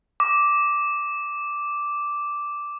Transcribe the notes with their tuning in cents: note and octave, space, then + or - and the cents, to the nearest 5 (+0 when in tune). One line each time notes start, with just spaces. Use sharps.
D6 -5